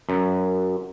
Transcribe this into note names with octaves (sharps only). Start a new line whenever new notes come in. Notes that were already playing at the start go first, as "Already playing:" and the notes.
F#2